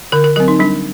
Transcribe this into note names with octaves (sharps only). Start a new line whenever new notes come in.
D3 A#4
A#4
F#3 C4 A#4
D#4
G3 D4